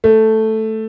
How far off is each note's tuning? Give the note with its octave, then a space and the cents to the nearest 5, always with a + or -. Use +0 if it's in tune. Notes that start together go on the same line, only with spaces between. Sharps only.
A3 +0